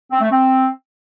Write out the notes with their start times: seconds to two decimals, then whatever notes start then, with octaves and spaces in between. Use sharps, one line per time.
0.11 C4
0.21 A3
0.31 C4